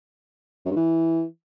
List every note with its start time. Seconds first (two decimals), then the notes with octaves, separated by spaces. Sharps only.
0.66 F#2
0.71 G2
0.76 E3